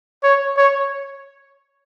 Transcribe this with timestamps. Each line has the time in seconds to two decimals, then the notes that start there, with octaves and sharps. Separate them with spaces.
0.24 C#5
0.58 C#5